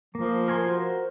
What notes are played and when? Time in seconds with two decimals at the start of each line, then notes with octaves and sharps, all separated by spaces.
0.15 F3 A#3
0.48 A#4 G#5 C6
0.66 F#4 A#4 C5